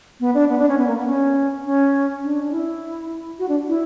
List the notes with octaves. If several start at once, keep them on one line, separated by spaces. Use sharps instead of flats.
B3
D4
B3
D4
C#4
B3
A#3
B3
C#4
C#4
D4
D4
E4
F#4
D4
E4